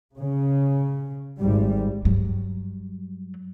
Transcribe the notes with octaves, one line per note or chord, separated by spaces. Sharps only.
C#3
G#1 G3
G2 F#3